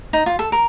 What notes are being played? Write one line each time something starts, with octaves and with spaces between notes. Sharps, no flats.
D#4
F4
A4
A#4